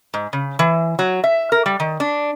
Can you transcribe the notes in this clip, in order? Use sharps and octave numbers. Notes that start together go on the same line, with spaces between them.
G#2
C#3
E3
F#3
E5
A#4
G3
D#3
D4